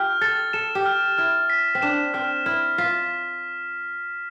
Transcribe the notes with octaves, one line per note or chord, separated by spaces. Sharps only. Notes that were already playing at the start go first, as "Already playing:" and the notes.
Already playing: F4 G4 F6
A4 A6
A4 E7
G4
F6
E4 F6
B6
C4
D4 E7
C4 F6
E4 F6
F4 B6